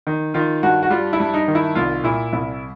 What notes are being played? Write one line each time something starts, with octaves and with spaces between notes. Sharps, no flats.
D#3
D#3 F4
G2 F#4
F#4
G3 F4
E4
G2
D#4
D#3
E4
C2 F4
A#2 E4
C2 E4